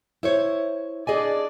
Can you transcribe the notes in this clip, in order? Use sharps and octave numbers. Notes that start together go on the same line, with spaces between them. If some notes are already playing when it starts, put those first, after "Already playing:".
E4 C5 C#5
D4 G#4 D5 D#5 G#5